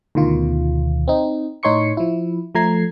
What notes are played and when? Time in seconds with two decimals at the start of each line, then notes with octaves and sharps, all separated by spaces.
0.15 D2 B2 D#3 F4
1.08 C4 D#4
1.63 A2 D#4 C#5 C6 C#6 C#7
1.97 F3 E4
2.55 F3 A3 A#5 G#6 C7